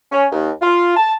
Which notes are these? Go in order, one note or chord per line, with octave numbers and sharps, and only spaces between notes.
C#4
D#2
F4
A5